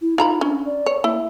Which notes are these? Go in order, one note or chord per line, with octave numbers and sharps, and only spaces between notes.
E4
D#4 F4 A#5 B5
C#4 D4
D5
C#5
A#3 E4